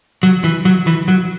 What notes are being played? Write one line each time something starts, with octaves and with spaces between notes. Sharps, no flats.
F#3
E3
F#3
E3
F#3